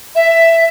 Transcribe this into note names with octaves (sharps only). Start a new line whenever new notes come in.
E5